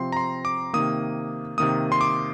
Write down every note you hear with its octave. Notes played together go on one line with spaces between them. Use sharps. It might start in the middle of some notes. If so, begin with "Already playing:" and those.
Already playing: C3 F3 C4 C6
A#5
C6
D6
C3 D#3 A#3 D#6
C3 D#3 A#3 D#6
C6
D6